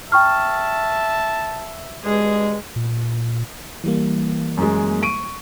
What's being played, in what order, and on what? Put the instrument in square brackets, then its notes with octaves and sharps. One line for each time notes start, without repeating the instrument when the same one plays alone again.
[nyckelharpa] E5 [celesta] G5 C#6 F6 [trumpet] A5
[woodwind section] G2 B2 G#3 [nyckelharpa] G#4
[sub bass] A#2
[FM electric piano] E3 G3 A#3
[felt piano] F#2 G#3
C#6 D7 D#7